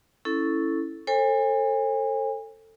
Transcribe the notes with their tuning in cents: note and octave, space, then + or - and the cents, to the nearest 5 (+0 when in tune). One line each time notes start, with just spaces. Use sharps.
C#4 +0 E4 -5 A4 +0
A4 +20 C5 +40 G#5 -35